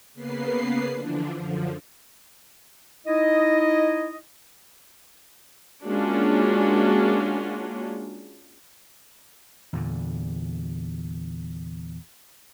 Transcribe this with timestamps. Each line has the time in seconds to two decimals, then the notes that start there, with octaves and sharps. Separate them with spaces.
0.14 C#3 A#3 B3 B4 C7
0.92 D3 E3 F3 D4
1.35 F#2 D3 F3
3.07 D#4 E4 D#5
5.85 G#3 A#3 C#4 D4 F4 F#4
9.73 E2 A#2 D3